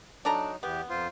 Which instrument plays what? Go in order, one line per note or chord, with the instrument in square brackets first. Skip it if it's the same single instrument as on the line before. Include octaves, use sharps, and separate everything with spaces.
[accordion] F#3 D#4 [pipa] D4 A4 A#5
[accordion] E2 G4 [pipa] B3
[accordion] F2 F4 C5